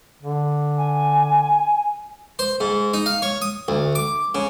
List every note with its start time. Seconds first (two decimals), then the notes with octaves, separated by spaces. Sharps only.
0.22 D3
0.77 G#5
2.39 C5
2.60 G#2
2.94 D#4
3.06 F5
3.22 C#5
3.41 D#6
3.68 D2
3.95 D6
4.35 C#3